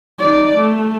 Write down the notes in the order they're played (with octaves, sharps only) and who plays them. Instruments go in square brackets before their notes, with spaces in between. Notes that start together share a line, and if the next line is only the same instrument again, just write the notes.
[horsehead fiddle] D#4 D5
A3